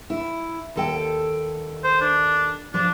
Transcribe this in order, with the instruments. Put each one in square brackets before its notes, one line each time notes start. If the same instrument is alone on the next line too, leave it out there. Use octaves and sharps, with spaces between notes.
[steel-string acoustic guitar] E4
D#2 A4 G5
[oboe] C5
D4
[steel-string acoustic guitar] F3 [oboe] D4